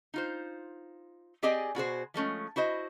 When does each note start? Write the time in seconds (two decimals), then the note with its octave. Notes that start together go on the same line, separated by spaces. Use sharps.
0.14 D#4 F4 C5
1.43 C4 G4 G#4 D5 D#5 G#5
1.75 B2 F#4 G#4 C5
2.14 F3 G#3 A3 C#4
2.56 E4 F#4 C5 D#5